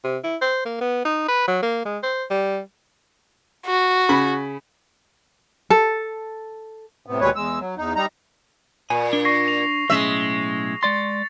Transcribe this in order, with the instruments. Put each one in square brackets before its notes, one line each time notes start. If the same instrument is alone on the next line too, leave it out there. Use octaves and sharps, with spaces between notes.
[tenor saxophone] C3
E4
C5
A#3
B3
D#4
B4
F#3
A#3
G#3
C5
G3
[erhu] F#4
[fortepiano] C#3 B5
[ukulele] A4
[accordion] A2 C3 B3
D#2 B2 G3 G#3 B4 C#5
E2 G#3 E6
F#3
E2 D#4
G3 D#4 A#5
[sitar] A#2 [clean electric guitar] G#5
[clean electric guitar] D4
[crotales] C#6 A#6 C7
F7
[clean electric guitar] B1 A2 C#4 [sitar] G#3 E5
[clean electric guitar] G#3 D5 C6 [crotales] A6 C#7